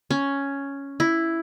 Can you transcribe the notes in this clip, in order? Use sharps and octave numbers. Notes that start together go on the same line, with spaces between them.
C#4
E4